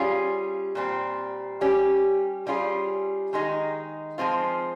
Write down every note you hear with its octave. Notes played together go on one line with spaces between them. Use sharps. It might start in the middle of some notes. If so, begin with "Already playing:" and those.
Already playing: G3 C#4 F4 G#4
A#2 G3 C4
G3 C#4 G4
G3 C#4 F4 G#4
D#3 G#3 D#4 G#4
F3 G#3 C4 F4